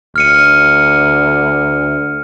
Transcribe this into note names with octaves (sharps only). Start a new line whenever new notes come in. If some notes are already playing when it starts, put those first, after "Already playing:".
D2 F6 C#7 D#7